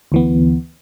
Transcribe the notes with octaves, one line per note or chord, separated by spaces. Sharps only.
D2 E3 B3